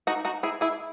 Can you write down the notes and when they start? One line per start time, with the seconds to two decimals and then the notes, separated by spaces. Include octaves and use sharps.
0.07 D#4 F#4
0.25 D#4 F#4
0.43 E4 G#4
0.61 E4 G#4